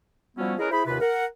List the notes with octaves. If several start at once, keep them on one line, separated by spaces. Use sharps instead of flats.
F3 G3 B3 C#4 E4 F#4
C#4 E4 G#4 A#4 B4 D#5
E4 G#4 C5 B5
D#2 C3 F4 B4
A#4 F#5